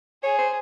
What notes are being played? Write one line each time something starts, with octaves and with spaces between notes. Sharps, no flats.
G#4 C#5
C5